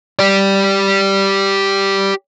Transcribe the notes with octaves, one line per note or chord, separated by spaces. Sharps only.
G4 D5